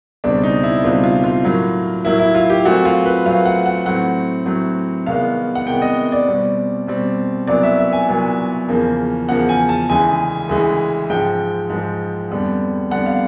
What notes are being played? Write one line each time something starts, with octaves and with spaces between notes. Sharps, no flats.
C#2 B2 G3 C4 D4
D#4
E4
C#2 B2 G3 C4 F4
F4
F4
A2 F#3 A#3
A2 F#3 A#3 E4
E4
F4
G4
A#2 F#3 A3 C4 F#4
F4
B4
A#2 F#3 A3 C4 F5
F#5
F#5
A2 F#3 A3 C4 F#5
A2 F#3 A3 C4
C2 C3 D#3 G#3 B3 F5
F#5
C2 C3 D#3 G#3 B3 G5
D#5
D5
B2 G3 C4
B2 G3 C4
C2 A#2 F#3 B3 D5
E5
E5
G#5
C2 A#2 F#3 B3
E2 C#3 F3 A#3
E2 C#3 F3 A#3 F#5
G#5
A5
D2 C#3 E3 G#3 G#5
D2 C#3 E3 G#3
G#2 F3 G#3 G5
G#2 F3 G#3
F2 D3 G3 B3
F2 D3 G3 B3 F#5
F5